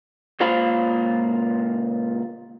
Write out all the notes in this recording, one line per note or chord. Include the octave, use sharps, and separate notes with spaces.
C#2 A#2 F4 C5 F5 B5